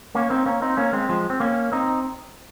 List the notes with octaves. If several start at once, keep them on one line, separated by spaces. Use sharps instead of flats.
A#3 C#4
C4 D#4
A#3 C#4
C4 D#4
A#3 C#4
G#3 C4
F3 G#3
C4
A#3 C#4
C4 D#4